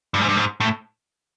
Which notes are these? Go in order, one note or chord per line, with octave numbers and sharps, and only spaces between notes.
G2
G#2
G2
G#2
A2